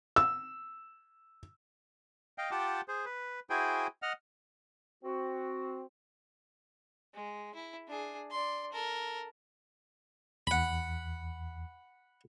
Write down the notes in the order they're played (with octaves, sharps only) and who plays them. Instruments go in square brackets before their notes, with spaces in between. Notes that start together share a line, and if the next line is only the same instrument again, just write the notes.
[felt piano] E6
[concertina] D#5 F5 G5
F4 G4 F#5 G5 A5 D6
G#4 C5
B4
E4 F#4 G#4 C5 G5 G#5
D#5 F#5 F6
[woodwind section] C4 F#4
[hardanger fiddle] G#3
E4
D4 G#4
D5 C6
A4 A#4
[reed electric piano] E2 [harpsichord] F#5 B5